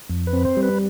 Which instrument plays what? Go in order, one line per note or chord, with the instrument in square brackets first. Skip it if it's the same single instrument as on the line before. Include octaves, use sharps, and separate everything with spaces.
[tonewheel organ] F2
B4
C4
C5
G3
B4